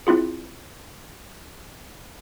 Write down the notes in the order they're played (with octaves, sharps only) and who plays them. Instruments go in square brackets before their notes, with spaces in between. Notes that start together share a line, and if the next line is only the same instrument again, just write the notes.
[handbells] C4 E4 F4 G#4